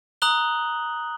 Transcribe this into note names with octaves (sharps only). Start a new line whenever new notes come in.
A#5 D#6 F#6 F#7 G7